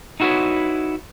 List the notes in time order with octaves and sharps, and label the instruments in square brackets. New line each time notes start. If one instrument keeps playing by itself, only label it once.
[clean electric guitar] D#4 E4 F#4 A#4 B4 C#5